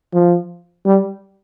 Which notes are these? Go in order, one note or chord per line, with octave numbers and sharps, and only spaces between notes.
F3
G3